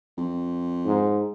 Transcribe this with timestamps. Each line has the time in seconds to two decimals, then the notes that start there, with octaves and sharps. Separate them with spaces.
0.17 F2
0.85 G#2